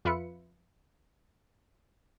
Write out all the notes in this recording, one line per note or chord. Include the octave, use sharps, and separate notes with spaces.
F2 F4 B4 E5 B5 C#7